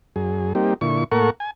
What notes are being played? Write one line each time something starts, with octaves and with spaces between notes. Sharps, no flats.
F#2 G#4
G3 A#3 C4 D#4 G4
A#2 D3 E4 C#6
A2 A#3 A4 A#4 F#5 C#6
G#5